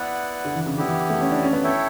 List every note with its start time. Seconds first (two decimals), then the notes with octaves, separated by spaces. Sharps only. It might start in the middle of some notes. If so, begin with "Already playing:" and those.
Already playing: B3 E4 B4 D5 F#5
0.45 D3
0.55 E3
0.66 C#3
0.77 D3 B3 E4 G4
0.88 E3
1.10 A3
1.21 C#4
1.31 D4
1.43 C#4
1.53 B3
1.64 E4 A4 C#5 E5 G5